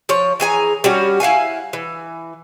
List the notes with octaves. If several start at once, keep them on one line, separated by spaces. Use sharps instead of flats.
F3 C#5
E3 G#4 G#5 A#5
G3 C#4 F#4
E4 F5 F#5 G#5
E3